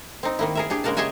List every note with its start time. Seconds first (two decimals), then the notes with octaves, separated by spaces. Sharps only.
0.23 C4 D#4
0.39 D#3 A#3 E4
0.55 G#4 A#4 E5
0.70 D4 G4 G#4
0.84 C#3 G#3 A#3 A#4 F#5 A5
0.97 G4 G#4 C#5 D#5 E5 G#5